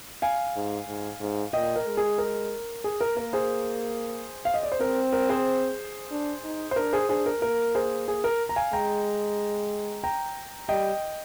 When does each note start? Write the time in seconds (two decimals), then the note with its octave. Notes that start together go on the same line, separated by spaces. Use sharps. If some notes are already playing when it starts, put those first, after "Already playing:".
0.22 F5 G#5
0.56 G#2
0.88 G#2
1.21 G#2
1.53 A#2 D#5 G5
1.76 A#4
1.86 G#3
1.97 G#4
2.18 A#4
2.84 G#4
3.01 A#4
3.17 A#3 A#4
3.33 G#4 C5
4.45 F5
4.54 D#5
4.63 D5
4.72 C5
4.80 C4 A#4
5.13 A#4
5.29 G#4 C5
6.11 D4
6.44 D#4
6.71 C5
6.76 D4 A#4
6.93 G#4 C5
7.09 D4 G#4 C5
7.26 A#4
7.42 A#3 A#4
7.75 G#4 C5
8.08 G#4
8.24 A#4
8.49 A#5
8.56 F5 G#5
8.73 G#3 G5 A#5
10.04 G5 A#5
10.69 G3 D#5 G5